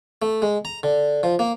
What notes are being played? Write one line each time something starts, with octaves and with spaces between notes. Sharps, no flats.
A3
G#3
A#5
D3
F3
A#3